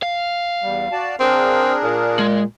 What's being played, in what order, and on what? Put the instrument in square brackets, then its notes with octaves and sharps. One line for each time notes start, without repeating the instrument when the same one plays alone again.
[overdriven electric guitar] F5
[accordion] E2 G3
F#4 D5 A5
[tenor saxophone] C4 [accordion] D4 G#4 A#4
[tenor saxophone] A#2
[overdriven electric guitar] G#3